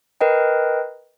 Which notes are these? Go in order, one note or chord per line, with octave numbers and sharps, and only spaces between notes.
A#4 B4 D#5 G5